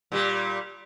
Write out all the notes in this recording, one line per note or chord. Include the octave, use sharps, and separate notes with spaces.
A#2 G3